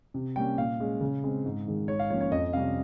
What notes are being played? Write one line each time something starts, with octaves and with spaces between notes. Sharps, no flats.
C3
G3 A#3 C#4 G5
A#2 F5
G#3 C#4
C#3
G#3 C4
G#2
D#3 G#3
G#2 C#5
F5
F3 A#3 C#4 C#5
C#5
F2 D#5
C3 G3 C#4 F5